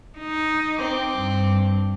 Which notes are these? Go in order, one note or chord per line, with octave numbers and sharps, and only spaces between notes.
D#4
C4 D6
G2